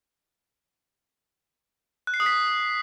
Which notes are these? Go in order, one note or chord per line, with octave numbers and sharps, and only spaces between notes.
F#6
C7
D#6
B6